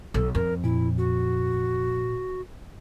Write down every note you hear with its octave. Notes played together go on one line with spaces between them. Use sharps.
B1 A4
F2 A#4
A#2 E4
F#4